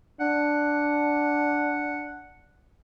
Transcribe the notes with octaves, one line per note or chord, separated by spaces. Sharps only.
D4 F#5